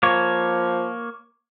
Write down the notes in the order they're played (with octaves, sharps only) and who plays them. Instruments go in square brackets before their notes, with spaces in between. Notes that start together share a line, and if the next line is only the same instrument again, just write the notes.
[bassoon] F3 [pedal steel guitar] A#3 C#5